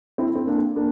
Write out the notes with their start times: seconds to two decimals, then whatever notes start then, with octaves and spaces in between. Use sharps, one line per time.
0.18 C4 E4
0.36 C4
0.47 A#3 D4
0.76 A#3 D4